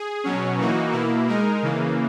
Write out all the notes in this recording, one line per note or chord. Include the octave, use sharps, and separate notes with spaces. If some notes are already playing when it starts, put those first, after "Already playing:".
Already playing: G#4
B2 F#3 C#4
E3 A#3 D#4 F#4
B2 A#3 E4
G#3 D#4 A#4
C#3 E3 A#3